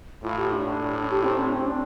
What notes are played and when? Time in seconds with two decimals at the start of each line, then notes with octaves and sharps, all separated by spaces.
0.23 A2 F4
0.38 G4
0.52 D4
0.66 A2
1.10 G4
1.23 C4
1.38 D4
1.52 C4
1.67 D4